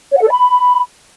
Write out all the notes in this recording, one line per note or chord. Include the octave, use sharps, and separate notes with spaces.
C#5
F#5
A4
D5
B5